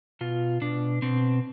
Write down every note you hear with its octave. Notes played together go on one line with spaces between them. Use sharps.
B2 F4
B2 D4
B2 C4